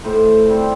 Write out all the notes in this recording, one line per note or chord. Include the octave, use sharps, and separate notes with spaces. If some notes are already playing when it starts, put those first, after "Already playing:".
A2 C5
G3 C4